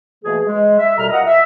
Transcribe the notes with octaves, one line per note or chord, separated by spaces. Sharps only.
B2 E3 A3 A#3 G#4
G#3
E5
D#2 B2 G3 A4 A#5 F6
F4 A#4 D#5 F#5
E5